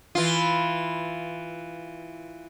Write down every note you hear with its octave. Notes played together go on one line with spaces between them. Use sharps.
E3 F4